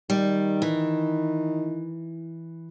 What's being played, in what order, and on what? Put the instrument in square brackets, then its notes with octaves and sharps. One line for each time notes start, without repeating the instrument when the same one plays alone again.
[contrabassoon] D#3 [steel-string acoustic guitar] G3
[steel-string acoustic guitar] E3